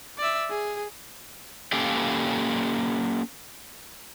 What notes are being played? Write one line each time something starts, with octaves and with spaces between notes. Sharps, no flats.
D5 E5
G#4
A#3 C#4 G4 A4 F5 G5